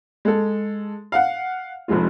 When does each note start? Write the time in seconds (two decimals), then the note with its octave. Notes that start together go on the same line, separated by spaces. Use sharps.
0.25 G#3 A4
1.12 F5 F#5
1.88 F1 F2 C3 G#3 F4